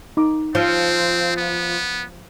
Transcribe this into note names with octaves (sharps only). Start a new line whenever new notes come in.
D#4 D6
F3 C4
B3